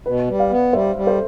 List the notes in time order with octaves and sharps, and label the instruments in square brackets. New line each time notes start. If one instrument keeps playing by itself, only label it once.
[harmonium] B2 [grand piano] B4
[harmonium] G3
[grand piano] D5 F5
[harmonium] B3
[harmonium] G3 [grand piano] C5 E5
[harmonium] G3
[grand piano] A4 C5